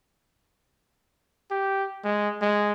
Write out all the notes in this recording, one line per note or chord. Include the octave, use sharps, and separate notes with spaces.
G4
G#3
G#3